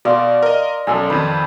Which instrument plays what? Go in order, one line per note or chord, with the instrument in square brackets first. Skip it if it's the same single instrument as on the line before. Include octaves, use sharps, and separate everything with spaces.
[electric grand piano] B2 [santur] D5 F5 C6
[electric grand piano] A#4 D#5
[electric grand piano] B1 F#2 [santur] A4 G#5
[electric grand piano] F2 D#3 [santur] B4